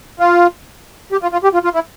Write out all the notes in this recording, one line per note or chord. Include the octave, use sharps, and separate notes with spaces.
F4
G4
F4
F4
G4
F4
F4
E4